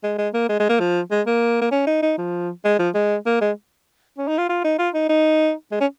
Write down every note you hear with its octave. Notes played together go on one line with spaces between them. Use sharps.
G#3
G#3
A#3
G#3
G#3
A#3
F3
G#3
A#3
A#3
C#4
D#4
D#4
F3
G#3
F3
G#3
A#3
G#3
C#4
D#4
F4
F4
D#4
F4
D#4
D#4
G#3
C#4